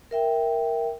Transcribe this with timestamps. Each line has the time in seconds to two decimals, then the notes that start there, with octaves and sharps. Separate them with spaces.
0.11 A#4 E5 G5